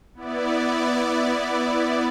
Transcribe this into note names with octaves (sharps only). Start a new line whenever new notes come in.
B3 E4 D5